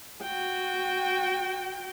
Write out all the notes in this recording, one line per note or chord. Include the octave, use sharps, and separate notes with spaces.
F#4 G5